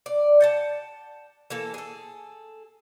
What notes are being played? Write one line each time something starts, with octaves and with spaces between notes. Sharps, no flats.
D5
F#5 G5 A5
E3 A#3 A4
G#4 A4